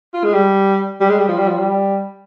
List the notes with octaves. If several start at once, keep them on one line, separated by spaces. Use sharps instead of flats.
F4
G#3
G3
G3
G#3
G3
F3
G3
F3
G3